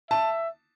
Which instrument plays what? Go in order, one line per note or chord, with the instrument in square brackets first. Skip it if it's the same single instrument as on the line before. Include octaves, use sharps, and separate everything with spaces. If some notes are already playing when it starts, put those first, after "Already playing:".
[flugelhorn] E5 [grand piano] A5